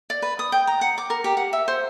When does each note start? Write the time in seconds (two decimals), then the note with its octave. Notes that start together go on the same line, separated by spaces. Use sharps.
0.10 D5
0.22 B4
0.39 D#6
0.52 G5
0.67 A#5
0.81 F#5
0.98 D6
1.10 A#4
1.24 G4
1.37 F#5
1.53 E5
1.68 C5